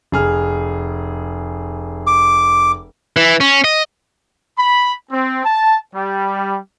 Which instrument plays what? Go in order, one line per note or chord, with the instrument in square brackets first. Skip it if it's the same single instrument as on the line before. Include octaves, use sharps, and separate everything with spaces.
[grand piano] F1 G#4 F6
[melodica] D6
[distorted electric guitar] E3
C#4
D#5
[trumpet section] B5
C4
A5
G3